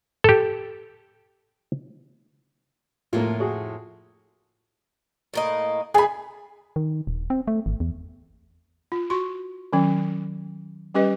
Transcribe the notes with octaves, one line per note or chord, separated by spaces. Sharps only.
G4 A4
F2 A2 F3 A#3 F4
F#4 G#4
A2 A#3 D#5
A3 G#4 G#5 B5
D#3
D#1
C4
A3
G#1
E2
F4
F#4 C6 C#6
D#3 F#3 C#4
G3 C#4 G4 B4 D#5